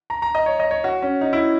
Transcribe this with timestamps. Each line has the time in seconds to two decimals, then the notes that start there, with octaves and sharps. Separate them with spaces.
0.10 A#5
0.22 A#5
0.35 D#5
0.46 C#5
0.60 D#5
0.71 C#5
0.84 F#4
1.02 C#4
1.21 D#4
1.33 E4